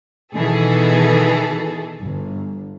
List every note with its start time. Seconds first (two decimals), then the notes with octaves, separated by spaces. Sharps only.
0.35 B2 D#3 E3 G#4 A4
2.00 G1